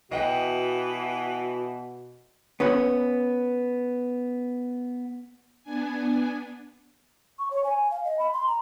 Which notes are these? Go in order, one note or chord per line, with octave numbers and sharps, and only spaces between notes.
B2 E3 F#4 D#5 F#5 G5
B3 C#4 B4
B3 D4 G#5
C#6
C#5
G#5
F5
D#5
B5
C6
A#5